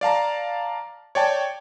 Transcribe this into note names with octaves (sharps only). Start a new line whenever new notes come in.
D5 F5 A5 A#5
C#5 D5 G5 A5